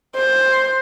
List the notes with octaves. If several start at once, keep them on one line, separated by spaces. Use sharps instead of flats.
C5